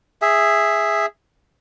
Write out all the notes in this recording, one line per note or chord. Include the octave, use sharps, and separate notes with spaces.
G#4 E5